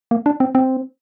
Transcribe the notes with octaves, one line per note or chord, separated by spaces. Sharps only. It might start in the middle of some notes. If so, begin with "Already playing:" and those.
A#3
D4
C4
C4